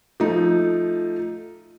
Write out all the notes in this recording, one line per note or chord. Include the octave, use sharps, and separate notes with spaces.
F3 A3 D#4